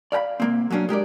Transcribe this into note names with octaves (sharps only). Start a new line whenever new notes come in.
D5 F5 G5 B5
C2 A#3 C4
F#3 A#3 C#4 D4
G#3 G4 A#4 D5